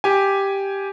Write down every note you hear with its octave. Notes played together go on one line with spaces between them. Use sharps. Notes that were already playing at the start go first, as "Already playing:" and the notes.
G4 G#5